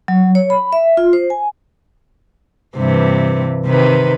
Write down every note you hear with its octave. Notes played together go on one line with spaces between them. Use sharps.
F#3
C#5
B5
E5
F4
C5
G#5
G2 C3 E3
C3 D#3 B4